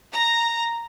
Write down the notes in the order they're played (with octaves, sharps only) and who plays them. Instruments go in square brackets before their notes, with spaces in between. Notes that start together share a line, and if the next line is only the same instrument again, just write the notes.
[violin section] A#5